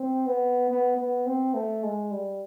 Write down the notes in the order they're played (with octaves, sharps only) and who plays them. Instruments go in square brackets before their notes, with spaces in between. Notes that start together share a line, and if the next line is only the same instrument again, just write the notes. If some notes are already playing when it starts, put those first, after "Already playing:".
Already playing: [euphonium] C4
B3
B3
B3
C4
A3
G#3
G3